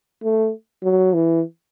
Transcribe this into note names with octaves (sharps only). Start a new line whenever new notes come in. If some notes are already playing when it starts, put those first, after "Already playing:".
A3
F#3
E3